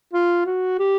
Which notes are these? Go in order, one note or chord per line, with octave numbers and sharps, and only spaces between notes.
F4
F#4
G4